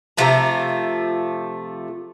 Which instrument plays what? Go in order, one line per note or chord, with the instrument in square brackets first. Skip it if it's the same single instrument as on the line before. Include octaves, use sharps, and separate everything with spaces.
[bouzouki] C3 F3 A3 A#5